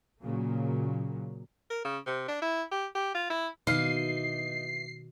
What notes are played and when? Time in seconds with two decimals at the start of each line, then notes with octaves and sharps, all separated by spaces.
0.21 A#2 C#3 F#3 A#3
1.70 A#4
1.84 C#3
2.06 C3
2.28 D4
2.42 E4
2.71 G4
2.95 G4
3.14 F4
3.30 E4
3.67 B2 D#3 E3 D#4 F5 C7